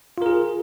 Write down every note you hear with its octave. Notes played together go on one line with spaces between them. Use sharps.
F4 G#4 A#4